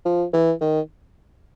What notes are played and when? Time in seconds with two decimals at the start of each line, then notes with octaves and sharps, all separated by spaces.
0.05 F3
0.33 E3
0.61 D#3